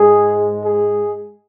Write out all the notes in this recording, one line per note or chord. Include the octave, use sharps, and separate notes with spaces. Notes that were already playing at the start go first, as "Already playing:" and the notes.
Already playing: G#2 G#3 G#4
G#4